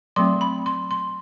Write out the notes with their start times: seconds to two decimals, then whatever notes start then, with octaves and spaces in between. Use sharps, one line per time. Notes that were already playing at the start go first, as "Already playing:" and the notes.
0.16 F#3 A3 C4 C6
0.41 B5
0.66 C6
0.91 C6